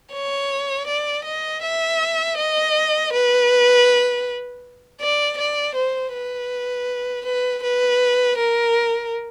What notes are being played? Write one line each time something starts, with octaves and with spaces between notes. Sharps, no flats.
C#5
D5
D#5
E5
D#5
B4
D5
D5
C5
B4
B4
B4
A#4